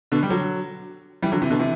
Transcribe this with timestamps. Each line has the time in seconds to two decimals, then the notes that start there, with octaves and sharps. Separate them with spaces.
0.12 B2 D3
0.23 G3
0.30 D3 F#3
1.22 E3 G3
1.32 D3 F#3
1.42 C3 E3
1.50 B2 D3
1.59 C3 E3